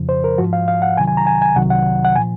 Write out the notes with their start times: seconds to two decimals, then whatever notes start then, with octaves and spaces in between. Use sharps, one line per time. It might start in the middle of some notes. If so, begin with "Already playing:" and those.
Already playing: F2 C#3 F3
0.09 C5
0.24 A#4
0.38 G#2 F3 F#4
0.53 F5
0.68 F5
0.82 F#5
0.97 C2 C3 D#3 F#3 G#5
1.07 G#5
1.17 A#5
1.27 G#5
1.42 G#5
1.56 C2 C3 D#3 F#3 F#5
1.70 F#5
2.05 F#5
2.16 A#2 F3 G#5